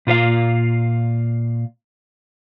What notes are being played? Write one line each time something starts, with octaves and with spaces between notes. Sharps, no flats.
A#2 F4 B4 F5